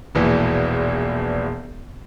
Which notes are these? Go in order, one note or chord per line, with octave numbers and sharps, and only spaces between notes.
E1 A#1 E3